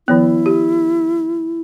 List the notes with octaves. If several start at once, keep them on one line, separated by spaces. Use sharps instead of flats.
D#3 F3 B3 E4
G4